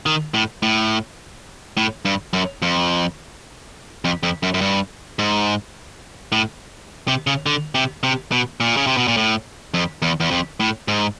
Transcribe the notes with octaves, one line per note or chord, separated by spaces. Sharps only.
D#3
A2
A2
A2
G2
F#2
F2
F2
F2
F#2
F#2
G2
G#2
A2
C3
C#3
D3
C3
C3
B2
A#2
C#3
C3
B2
A#2
A2
F2
E2
E2
F2
A2
G#2